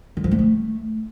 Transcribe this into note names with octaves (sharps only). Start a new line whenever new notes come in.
D#3
F3
A#3
A3